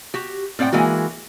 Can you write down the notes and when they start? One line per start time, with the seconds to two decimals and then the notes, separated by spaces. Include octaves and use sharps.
0.14 F#4 G4
0.59 A2 C4 D5 F#5 G5
0.73 E3 G#3 A#3 F#4